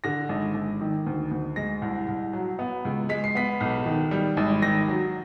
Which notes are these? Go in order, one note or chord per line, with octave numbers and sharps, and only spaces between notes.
D3 A#6
G#1
G#1
D#3
D2
D2
G#3 A#6
C2
C2
F#3
B3
C#2
G#3 B6
C7
B3 B6
B1
D#3
G3
G#1
D#3 A#6
F#3